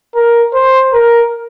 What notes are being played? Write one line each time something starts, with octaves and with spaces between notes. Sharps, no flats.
A#4
C5
A#4